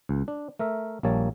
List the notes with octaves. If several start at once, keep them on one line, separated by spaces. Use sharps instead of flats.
C#2
D4
A3 A#4 E5
A#1 G3 A#3 C#5 A5